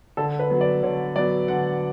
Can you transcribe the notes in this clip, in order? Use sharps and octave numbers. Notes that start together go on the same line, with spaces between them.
D3 A4
B4
F#3 B3
D5
D3 C#5
F#3 B3 D5
D3 F#5